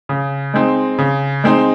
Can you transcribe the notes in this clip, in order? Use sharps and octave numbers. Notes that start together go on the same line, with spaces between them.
C#3
G#3 C4 D#4
C#3
G#3 C4 D#4